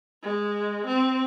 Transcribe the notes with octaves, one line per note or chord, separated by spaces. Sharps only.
G#3
C4